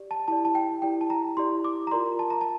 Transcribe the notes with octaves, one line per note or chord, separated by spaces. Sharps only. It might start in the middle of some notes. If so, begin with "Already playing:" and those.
Already playing: G4 D5
A5
E4 G4 D5 A5
A5
G5
E4 G4 D5 G5
A5
A#5
E4 G4 D5 C6
D6
A#5
F4 A#4 D5 C6
A5
A#5
A5